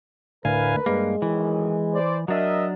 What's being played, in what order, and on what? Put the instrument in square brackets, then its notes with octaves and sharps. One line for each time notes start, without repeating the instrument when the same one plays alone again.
[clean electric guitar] D2 [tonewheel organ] A2 F5 G#5 [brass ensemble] A#4 B4
[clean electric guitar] G2 A#3 [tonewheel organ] G#3
[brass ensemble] F#2 A2 D#3 [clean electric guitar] E3
[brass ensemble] C5 D5
[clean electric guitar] F#3 D4 [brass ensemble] A#4 D#5 E5